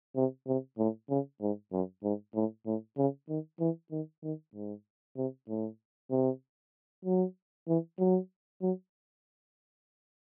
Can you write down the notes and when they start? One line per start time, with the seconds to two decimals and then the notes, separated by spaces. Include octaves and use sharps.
0.16 C3
0.47 C3
0.78 A2
1.09 C#3
1.41 G#2
1.72 F#2
2.03 G#2
2.35 A2
2.66 A2
2.97 C#3
3.29 D#3
3.60 E3
3.91 D#3
4.23 D#3
4.54 G#2
5.17 C3
5.48 A2
6.11 C3
7.05 F#3
7.68 E3
7.99 F#3
8.62 F#3